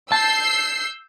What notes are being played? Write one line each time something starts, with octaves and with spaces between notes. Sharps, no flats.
A5 E6 G6 C7